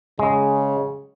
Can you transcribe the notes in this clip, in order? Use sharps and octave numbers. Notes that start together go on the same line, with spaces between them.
C#3 G#3